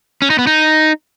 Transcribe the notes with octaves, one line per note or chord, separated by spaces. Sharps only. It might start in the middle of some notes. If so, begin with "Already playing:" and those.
C#4
D#4
B3
D#4